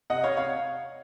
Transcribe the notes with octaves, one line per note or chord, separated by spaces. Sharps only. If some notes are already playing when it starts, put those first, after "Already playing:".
C3 D#5 F#5
C#5 F5
C#5 F5